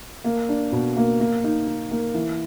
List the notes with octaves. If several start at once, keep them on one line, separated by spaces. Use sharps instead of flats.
A#3
D4
B2
A#3
A#3
D#4
D#4
A#3
E3